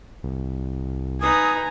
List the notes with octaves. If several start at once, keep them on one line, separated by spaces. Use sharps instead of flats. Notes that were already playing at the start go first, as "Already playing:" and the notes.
C2
D#4 B4 G#5 A#5 D#6